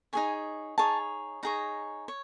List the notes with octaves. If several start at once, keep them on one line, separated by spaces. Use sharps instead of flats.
D#4 G#4 C#5 G#5
D#4 G#4 C#5 A5
D#4 G#4 C#5 A#5
C#5